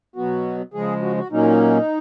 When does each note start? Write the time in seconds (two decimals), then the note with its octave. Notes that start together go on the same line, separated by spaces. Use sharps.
0.16 B2 F#3 B3 F#4
0.74 C#3 F3 G#3 G#4
1.02 F#4
1.18 F#4
1.31 A#2 F#3 A#3 C#4 D#4